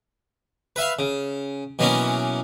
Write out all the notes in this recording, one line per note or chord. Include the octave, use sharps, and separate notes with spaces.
B4 E5 F5
C#3
B2 E3 F#3 A#3 B3 C#4